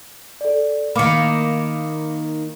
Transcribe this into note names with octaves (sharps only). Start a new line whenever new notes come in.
A4 D5
D#3 A#3 B5 D6 C#7